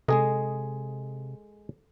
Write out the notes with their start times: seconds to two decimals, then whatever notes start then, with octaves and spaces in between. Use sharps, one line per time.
0.08 C3 G#3 G#4 A4 D#5